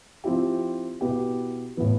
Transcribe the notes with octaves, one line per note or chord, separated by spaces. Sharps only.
F3 C4 E4 G4
B2 B3 E4 G4
A2 E3 B3